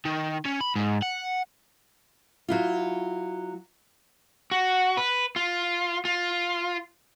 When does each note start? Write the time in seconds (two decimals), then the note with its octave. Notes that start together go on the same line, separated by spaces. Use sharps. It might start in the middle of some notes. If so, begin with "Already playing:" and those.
0.05 D#3
0.45 C#4
0.61 B5
0.76 G#2
1.03 F#5
2.48 F#3 E4 F4
4.51 F#4
4.97 B4
5.36 F4
6.05 F4